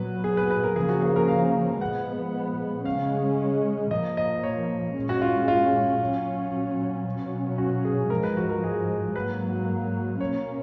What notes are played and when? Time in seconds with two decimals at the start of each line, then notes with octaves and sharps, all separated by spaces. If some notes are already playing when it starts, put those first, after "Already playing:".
Already playing: A#2 F#3 B3 B4
0.24 G#4
0.37 B4
0.51 B4
0.63 A#4
0.76 C#3 F3 A#3 C#4 G#4
0.89 F#4
1.02 G#4
1.16 A#4
1.28 F5
1.81 A#2 F3 G#3 B3 F#5
2.85 C#3 G#3 C#4 F5
3.91 A#2 F3 A#3 D#5
4.17 D#5
4.43 C#5
4.96 A#2 G#3 C#4
5.09 F#4
5.21 F4
5.48 F4
6.01 A#2 F#3 C#4
7.05 B2 F#3 C#4
7.58 F#4
7.85 G#4
8.10 G#2 F3 G#3 A#4
8.23 B4
8.37 F#4
8.49 A#4
8.63 G#4
9.15 G#2 F#3 A#3 B4
10.21 B2 A#3 C#4 C#5